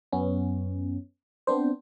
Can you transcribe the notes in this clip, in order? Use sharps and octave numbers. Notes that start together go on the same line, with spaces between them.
F#2 B3 C#4
B3 C4 D4 C5